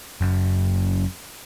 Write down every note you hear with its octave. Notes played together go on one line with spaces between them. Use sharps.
F#1 F#2